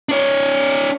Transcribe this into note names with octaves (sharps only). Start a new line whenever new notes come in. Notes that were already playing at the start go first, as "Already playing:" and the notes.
D4 C#5